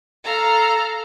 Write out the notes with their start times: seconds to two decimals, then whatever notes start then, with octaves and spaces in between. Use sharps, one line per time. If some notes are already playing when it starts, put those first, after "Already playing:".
0.23 A4 F5 A#5